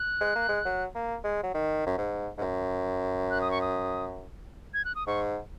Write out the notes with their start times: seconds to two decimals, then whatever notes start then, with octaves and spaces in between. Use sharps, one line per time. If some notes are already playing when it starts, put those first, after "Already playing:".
Already playing: F#6
0.21 G#3
0.35 A#3
0.49 G#3
0.65 F#3
0.95 A#3
1.24 G#3
1.43 F#3
1.54 D#3
1.86 F#2
1.98 G#2
2.38 G#2
2.41 F#2
3.31 F#6
3.41 D#6
3.51 C#6
3.61 D#6
4.74 G#6
4.85 F#6
4.95 D#6
5.07 G#2 C#6